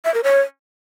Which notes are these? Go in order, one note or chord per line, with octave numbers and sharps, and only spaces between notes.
E5
A#4
C#5